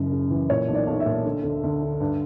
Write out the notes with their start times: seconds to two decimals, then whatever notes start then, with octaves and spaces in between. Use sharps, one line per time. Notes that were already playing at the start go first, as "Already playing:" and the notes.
Already playing: F#1 F#2
0.12 C#3
0.30 E3
0.49 A#2 C#5
0.68 B1
0.74 D5
0.87 B1
1.00 E5
1.06 A#2
1.25 D3
1.43 D2
1.63 D2
1.82 D3
2.00 G2